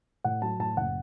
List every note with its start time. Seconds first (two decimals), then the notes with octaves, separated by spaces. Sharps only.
0.24 A2 F#5
0.42 F#3 A5
0.59 A2 A5
0.77 F#1 F#5